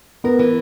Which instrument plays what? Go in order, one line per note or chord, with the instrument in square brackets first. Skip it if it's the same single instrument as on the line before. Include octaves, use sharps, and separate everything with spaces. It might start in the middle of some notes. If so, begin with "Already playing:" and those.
[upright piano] B3 [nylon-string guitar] A#4
[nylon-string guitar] E3